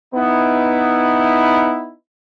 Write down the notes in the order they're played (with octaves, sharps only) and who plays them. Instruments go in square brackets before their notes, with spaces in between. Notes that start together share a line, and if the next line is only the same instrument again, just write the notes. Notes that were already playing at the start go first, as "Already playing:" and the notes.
[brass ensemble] B3 D#4 E4